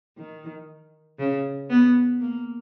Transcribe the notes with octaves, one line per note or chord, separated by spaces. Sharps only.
D#3
C#3
B3
A#3